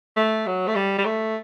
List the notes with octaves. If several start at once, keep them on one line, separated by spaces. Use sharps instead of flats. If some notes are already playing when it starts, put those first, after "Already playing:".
A3
F#3
A3
G3
G3
A3